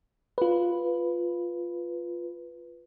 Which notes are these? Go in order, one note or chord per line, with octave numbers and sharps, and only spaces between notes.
F4 B4